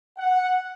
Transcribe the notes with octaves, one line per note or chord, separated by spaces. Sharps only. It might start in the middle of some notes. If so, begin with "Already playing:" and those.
F#5